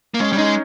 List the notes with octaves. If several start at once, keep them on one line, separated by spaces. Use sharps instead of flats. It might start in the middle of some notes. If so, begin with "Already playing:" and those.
A#3
G#3 C#4
G3 C#4
G#3 D#4